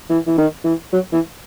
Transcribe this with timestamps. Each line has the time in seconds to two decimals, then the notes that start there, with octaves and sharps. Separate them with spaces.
0.10 E3
0.27 E3
0.38 D#3
0.65 E3
0.93 F#3
1.13 E3